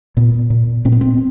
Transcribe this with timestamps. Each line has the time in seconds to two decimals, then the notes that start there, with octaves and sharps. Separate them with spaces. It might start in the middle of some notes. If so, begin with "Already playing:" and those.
0.17 A#2 B3
0.50 A#2
0.85 A#2 C4
0.92 B3
1.01 C4